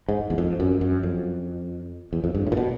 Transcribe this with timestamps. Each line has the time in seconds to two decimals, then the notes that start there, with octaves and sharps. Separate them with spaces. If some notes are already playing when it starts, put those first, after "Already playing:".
0.09 G#2
0.30 E2
0.38 F2
0.60 F#2
0.81 F#2
1.03 F2
2.13 E2
2.24 F2
2.35 G2
2.47 A2
2.52 A#2
2.57 B2